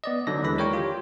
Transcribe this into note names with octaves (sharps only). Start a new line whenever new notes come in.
B3 D5 D#5
D3 F#3 D#4 D5 A#6
D#2 E3 G#3 B5 A#6
A#4 C#5 G5 C#6
F4 G4